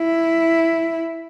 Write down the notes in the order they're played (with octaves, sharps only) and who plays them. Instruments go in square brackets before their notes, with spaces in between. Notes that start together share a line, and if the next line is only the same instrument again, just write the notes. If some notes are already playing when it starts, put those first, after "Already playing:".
Already playing: [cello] E4